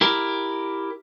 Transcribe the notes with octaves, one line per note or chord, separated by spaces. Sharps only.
E4 G4 A#4